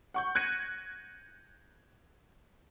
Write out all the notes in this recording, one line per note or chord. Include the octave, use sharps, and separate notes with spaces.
F#5 C#6 G6
F#6 G#6 A#6 C#7 D#7